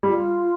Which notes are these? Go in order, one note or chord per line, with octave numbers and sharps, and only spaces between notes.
G3 F4